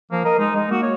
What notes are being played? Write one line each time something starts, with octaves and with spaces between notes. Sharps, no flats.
F3 A#3
A#4 D#5
G#3 D#4
G#3 D#4
A#3 F#4
C#5